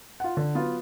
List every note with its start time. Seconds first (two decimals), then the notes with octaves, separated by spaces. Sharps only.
0.20 F4 F#5
0.37 D3
0.55 F#3 B3 F4